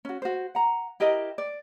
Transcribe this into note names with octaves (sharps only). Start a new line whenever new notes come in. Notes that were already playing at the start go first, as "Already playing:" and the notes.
C#4 F#4
F#4 C5
F#5 A#5
E4 G4 A#4 D#5
D5